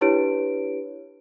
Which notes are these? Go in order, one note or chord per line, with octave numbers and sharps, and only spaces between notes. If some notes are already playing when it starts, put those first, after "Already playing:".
D4 E4 G4 B4 C#5 D7